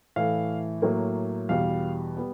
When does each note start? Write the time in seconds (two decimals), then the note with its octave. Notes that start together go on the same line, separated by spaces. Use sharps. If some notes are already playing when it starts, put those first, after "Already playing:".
0.16 A2 E3 A3 F5
0.82 A2 F#3 A#3
1.49 E2 B2 G3 F5
2.17 G3 B3